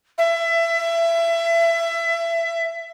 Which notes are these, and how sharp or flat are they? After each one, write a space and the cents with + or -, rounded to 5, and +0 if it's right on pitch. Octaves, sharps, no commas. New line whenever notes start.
E5 +25